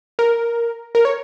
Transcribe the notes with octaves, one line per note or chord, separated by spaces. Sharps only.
A#4
A#4
C#5